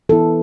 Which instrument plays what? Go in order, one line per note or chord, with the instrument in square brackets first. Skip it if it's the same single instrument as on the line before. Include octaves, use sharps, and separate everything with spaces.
[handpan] E3 B3 E4 A4